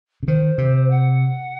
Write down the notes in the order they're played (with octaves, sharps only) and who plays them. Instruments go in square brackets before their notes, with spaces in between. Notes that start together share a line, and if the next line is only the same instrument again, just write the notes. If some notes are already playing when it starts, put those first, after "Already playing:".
[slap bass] C#3
[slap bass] D#3 [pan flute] C5
[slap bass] C3
[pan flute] F#5